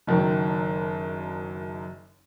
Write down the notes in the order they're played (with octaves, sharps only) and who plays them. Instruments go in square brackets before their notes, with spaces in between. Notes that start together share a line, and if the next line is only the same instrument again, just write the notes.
[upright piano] F#1 F#2 D#3